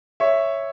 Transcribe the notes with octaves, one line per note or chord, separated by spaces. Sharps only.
C#5 E5